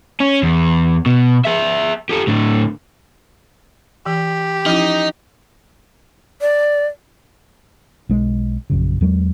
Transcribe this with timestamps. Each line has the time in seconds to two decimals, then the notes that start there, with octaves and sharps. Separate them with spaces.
0.20 C#4
0.43 E2
1.06 B2
1.45 G#4 E5
2.09 G4 A4
2.27 A2 D3
4.06 E3 G4
4.66 F3 C#4 D#4 E4
6.41 D5
8.09 B1 G#3
8.70 A#1 F#2 C#3
9.01 E2 F#3 G#3